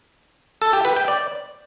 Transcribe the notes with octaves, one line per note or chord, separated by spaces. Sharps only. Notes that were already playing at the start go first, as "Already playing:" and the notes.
A4
G4
B4
G5
D5